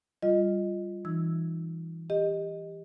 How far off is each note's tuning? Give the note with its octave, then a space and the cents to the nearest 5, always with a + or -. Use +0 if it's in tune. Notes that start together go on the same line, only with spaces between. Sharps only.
G3 +0 F4 +0 D#5 +0
E3 +0 D#4 -25 E6 +0
G4 +20 D#5 +0